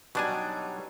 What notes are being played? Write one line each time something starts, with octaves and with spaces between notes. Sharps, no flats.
B2 F#3 G3 D4 D#4 G#5